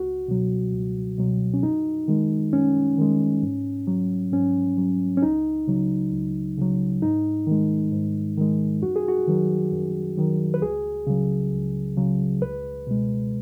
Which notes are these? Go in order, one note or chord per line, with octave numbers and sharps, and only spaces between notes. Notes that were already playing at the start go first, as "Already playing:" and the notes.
Already playing: C#2 F#4
B2 F#3
C#2
B2 F#3
C#4
F#2 D#4
D#3 G#3
F#2 C#4
D#3 G#3
G#2
F#3
G#2 C#4
F#3
C#4
C#2 D#4
C#3 F#3
C#2
C#3 F#3
G#2 D#4
D#3 G#3
G#2
D#3 G#3
F#2 F#4
G#4
F#4
D#3 F#3
F#2
D#3 F#3
B4
C#2 G#4
C#3 F#3
C#2
C#3 F#3
C#2 B4
B2 G#3